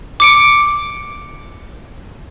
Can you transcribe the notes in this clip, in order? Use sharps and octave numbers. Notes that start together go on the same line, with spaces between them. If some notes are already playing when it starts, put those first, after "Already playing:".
D6 C#7 D7